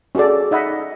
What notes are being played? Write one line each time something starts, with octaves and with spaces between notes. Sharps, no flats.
C#4 F#4 G#4 A4 D5
D#4 D#5 E5 F#5 B5